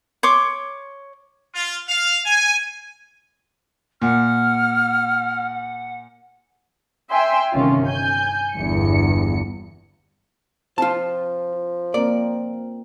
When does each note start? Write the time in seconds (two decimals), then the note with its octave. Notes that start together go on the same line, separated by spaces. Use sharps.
0.23 C#5 C6 D6
1.54 F4
1.88 F5
2.25 G#5
4.02 A#2 F#5 F6
7.11 E5 G5 G#5 C6
7.52 G1 C3 D#3 C#4 F4
7.85 G#5 G6
8.54 G1 E2 G2 C#7
10.78 F3 C4 F4 A5
11.94 A#3 C4 F4 A#4 D5